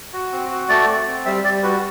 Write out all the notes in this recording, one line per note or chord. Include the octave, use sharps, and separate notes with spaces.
F#4
C4
F#4
A3 D5
C4
C4
G3 E5
G3 D5
F#4 B4